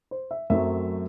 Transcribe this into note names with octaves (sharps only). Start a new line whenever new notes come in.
C5
E5
F#2 F#3 A3 C4 E5